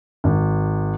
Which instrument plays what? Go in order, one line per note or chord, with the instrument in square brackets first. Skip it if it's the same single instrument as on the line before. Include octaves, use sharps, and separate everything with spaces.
[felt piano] G#1